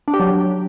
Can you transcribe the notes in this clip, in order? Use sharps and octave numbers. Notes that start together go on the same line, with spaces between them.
D4
G4
F#3